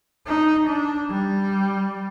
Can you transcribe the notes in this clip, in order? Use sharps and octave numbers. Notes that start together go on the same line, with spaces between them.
D#4
D4
G3